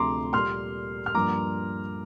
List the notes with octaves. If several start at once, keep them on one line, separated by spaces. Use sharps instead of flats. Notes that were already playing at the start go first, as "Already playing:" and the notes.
Already playing: D2 C3 F3 A#5 C6 D6
A#2 G3 A#3 C6 F6
F6
G2 F3 A#3 A#5 D6